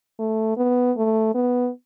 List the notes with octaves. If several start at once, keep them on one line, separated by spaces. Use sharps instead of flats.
A3
B3
A3
B3